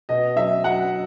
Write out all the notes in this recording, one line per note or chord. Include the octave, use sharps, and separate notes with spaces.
B2 D#5
F#3 E5
F#3 F#5